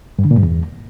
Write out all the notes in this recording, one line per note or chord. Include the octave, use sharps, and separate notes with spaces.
G2
D3
A#2
G2
E2